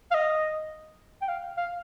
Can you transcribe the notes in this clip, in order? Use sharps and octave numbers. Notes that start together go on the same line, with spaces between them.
F5
D#5
G5
F5
F5